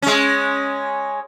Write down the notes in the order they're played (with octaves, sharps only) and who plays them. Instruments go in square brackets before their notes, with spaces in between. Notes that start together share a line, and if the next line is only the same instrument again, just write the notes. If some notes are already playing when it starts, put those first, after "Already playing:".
[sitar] G#3 C#4